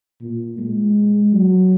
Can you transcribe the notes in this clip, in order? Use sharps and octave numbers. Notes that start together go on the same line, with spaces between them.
A#2
G#3
F#3